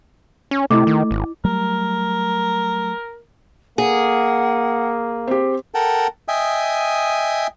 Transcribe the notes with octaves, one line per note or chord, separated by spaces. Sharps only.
C#4
C3 A3 E4 D#5 D6
D#3
G#1
F#3 G3 A3 A#4
A#3 G#4 F#5
C4 G4
A4 A#4 F#5 G5 A5
D#5 E5 G5 G#5 D#6